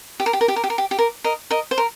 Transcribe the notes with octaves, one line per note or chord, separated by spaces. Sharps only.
G4
A#4
G4
A#4
G4
A#4
G4
A#4
G4
G4
A#4
A#4 D#5
A#4 D#5
C5
A#4